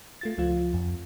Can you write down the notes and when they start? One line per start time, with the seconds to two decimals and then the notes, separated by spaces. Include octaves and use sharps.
0.21 A3 F4 A6
0.38 C#2 F3 F4
0.74 F2